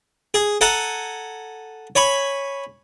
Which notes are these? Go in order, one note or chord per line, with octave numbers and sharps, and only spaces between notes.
G#4
A4 F#5 G#5 A#5
C#5 G#5 B5 C#6